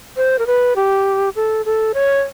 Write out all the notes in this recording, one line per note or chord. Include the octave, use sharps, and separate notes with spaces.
C5
A#4
B4
G4
A4
A4
C#5